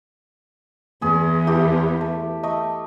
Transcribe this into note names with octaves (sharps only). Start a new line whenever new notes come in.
E2 G#4
E4 G4 A4
A3
A3 D#5